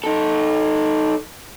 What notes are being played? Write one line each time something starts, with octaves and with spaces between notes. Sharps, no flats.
D#4 A4